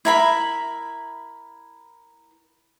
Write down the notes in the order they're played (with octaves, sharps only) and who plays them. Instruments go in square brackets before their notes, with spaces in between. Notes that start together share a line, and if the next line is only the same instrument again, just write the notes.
[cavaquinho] E4 A#4 B5